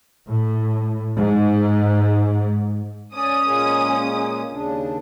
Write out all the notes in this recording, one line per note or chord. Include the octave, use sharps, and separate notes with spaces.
A2
G#2
C#4 D5 D#6
A#2 G#3 A#3
D#2 C#3 D4